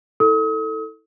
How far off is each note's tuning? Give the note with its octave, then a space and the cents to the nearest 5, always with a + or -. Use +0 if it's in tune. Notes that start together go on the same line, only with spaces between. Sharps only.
E4 -35 A4 +10 D#6 +40